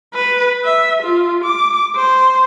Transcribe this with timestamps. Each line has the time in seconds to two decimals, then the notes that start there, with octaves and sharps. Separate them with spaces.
0.14 B4
0.64 E5
1.03 F4
1.45 D6
1.96 C5